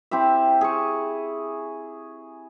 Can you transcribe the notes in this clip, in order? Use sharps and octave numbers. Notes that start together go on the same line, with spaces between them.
C4 E4 G4 E5
G#4 C#6